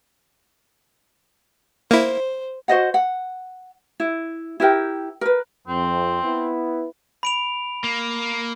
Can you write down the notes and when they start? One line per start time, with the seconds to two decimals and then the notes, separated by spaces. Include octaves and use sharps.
1.91 A#3 E4 C5
2.68 F#4 C5 D#5 F#5
2.94 F#5
4.00 E4
4.60 E4 G4 A#4 G5
5.21 A#4 B4
5.68 F2 C4
6.23 B3 E4 B4
7.23 B5 D7 F7
7.84 A#3